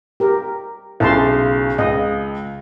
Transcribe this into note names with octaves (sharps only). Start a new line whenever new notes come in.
G4 A#4
B1 C#3 E4 A5 C6
C#2 D#5